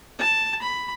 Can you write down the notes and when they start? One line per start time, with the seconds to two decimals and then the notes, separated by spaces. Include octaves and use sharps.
0.18 A5
0.62 B5